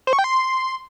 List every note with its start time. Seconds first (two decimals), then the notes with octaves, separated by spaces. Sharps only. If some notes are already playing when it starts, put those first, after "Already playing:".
0.07 C5
0.13 C#6
0.19 G5
0.24 C6